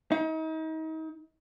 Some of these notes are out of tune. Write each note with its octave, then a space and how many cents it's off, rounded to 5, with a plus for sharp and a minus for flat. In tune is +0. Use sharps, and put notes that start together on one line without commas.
D#4 +35